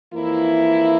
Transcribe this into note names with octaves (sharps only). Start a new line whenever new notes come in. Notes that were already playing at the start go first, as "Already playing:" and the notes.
F2 E3 A#3 E4